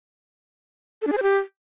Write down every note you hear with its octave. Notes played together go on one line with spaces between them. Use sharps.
A4
D4
G#4
C5
G4